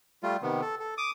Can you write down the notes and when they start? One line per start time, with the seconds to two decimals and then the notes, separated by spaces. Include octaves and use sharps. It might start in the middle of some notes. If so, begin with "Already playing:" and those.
0.23 G3 A3 F4
0.42 C3 D#3 B3
0.61 A4
0.80 A4
0.98 D6 D#6